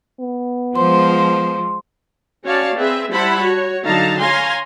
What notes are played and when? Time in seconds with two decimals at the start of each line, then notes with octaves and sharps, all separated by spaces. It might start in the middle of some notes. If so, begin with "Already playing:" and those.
0.20 B3
0.76 F3 G#3 C5 C6
2.44 C#4 F#4 C#5 D5 F5 A5
2.75 C4 G#4 B4 E5
3.11 G3 E4 C5 F#5 A5 B5
3.41 F#4 C#5
3.85 D3 F#3 D#4 F5 A5 A#5
4.19 C#5 F5 G#5 A#5 C6